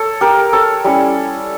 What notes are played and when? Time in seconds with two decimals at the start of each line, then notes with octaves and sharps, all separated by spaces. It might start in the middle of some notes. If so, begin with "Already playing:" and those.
Already playing: A4 C#5
0.21 G4 A#4
0.53 A4 C#5
0.84 G3 C#4 E4